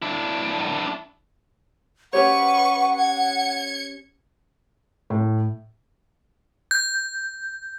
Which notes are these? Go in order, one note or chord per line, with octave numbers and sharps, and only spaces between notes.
D4 E4
C#4 G4 B4 C#5 F#5 C#6
G#6 C#7
A2
G6